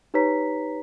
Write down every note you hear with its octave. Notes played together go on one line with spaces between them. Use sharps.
D#4 G4 B4 C#5 A#5 B6